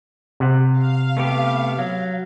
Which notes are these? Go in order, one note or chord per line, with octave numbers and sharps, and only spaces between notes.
C3 F#5
F5
A3 B3 G4
F#3